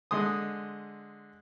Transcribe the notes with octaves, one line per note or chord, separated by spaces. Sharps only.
D3 G#3 C6 D#6